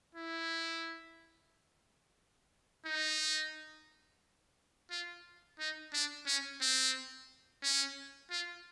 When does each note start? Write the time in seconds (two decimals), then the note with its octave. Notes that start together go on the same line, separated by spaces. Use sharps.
0.15 E4
2.86 D#4
4.91 F4
5.59 D#4
5.94 D4
6.27 C#4
6.61 C4
7.63 C#4
8.31 F4